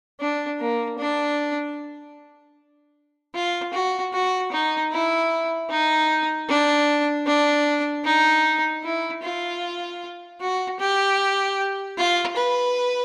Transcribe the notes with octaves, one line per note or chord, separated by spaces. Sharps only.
D4
A#3
D4
F4
F#4
F#4
D#4
E4
D#4
D4
D4
D#4
E4
F4
F#4
G4
F4
B4